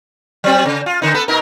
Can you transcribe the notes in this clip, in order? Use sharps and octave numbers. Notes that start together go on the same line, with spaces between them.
F#3 C4
C#3
F4
D3 D#4
B3 A4 B4
B2 D#4 A#4